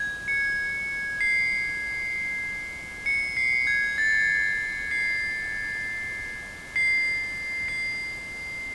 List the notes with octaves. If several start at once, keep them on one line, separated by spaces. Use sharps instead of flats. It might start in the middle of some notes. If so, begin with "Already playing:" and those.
Already playing: G#6
C#7
C7
C#7
C7
G#6
A6
C7
C7
C7